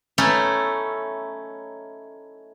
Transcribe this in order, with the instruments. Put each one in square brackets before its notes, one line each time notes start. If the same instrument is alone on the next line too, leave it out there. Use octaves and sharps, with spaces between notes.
[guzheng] A3 C#4 D#4 E4 A4